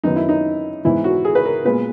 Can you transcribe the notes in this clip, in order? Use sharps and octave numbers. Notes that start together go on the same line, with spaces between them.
F#2 D#3 F#3 B3 D#4
E4
D#4
G#2 E3 B3 E4
F#4
G#4
B4
A#4
A#2 G#3 B3 B4